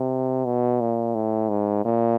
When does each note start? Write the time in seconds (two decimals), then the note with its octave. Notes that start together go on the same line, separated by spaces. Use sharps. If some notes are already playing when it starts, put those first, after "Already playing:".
Already playing: C3
0.45 B2
0.81 A#2
1.15 A2
1.49 G#2
1.85 A#2